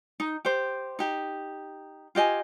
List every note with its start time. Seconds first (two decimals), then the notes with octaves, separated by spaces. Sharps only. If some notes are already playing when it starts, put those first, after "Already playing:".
0.20 D#4
0.45 G4 C5
0.99 D#4 G4
2.15 F4 G4 D#5 G#5